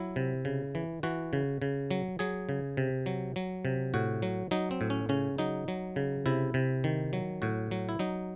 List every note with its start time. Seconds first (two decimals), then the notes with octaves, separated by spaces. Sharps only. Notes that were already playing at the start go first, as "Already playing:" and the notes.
Already playing: F#3 E4
0.16 C3
0.45 C#3
0.75 E3
1.03 E3 F#4
1.33 C#3
1.62 C#3
1.91 F#3
2.19 F#3 G#4
2.49 C#3
2.77 C3
3.06 F#3
3.36 F#3
3.65 C3
3.94 A2 F#4
4.22 F#3
4.51 F#3 D#4
4.71 C4
4.81 A2
4.90 C#4
5.09 C#3 C#4
5.38 F#3 D#4
5.68 F#3
5.96 C#3
6.26 C3 E4
6.54 C3
6.84 D#3
7.13 F#3
7.42 A2 F#4
7.71 F#3
7.89 E4
7.99 F#3 D#4